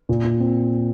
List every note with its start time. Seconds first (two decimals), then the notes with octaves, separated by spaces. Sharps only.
0.09 A#2
0.24 A#2
0.40 C4